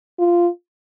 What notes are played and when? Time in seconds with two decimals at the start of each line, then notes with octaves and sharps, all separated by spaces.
0.19 F4